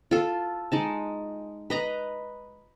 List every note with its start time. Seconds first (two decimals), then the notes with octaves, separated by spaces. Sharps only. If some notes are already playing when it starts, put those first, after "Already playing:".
0.11 F4 A4
0.72 G#3 D#4 A5
1.70 B4 D#5 A#5